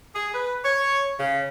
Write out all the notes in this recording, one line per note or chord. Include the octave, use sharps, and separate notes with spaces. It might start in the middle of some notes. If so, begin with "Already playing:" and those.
G#4
B4
C#5
C#3